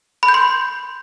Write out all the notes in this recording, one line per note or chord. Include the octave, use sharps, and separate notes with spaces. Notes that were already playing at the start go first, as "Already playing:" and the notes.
B5
G6
C6